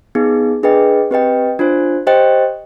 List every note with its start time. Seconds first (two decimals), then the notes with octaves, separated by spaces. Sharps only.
0.15 B3 D#4 G#4
0.63 D4 G#4 B4 D#5 G5
1.11 C4 G4 B4 D#5 G5
1.59 D4 F4 C5
2.07 G4 C5 D#5 G5